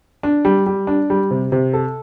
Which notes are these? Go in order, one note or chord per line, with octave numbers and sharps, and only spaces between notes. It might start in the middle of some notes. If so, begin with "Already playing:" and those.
D4
G3
G3
D4
G3
C3
C3
A4